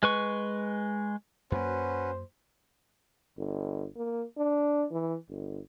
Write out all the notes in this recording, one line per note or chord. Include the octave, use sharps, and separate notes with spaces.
G#3 B4 C#6
F#2 A#3 C#4 F#4 B4 C5
G1
A#3
D4
E3
G1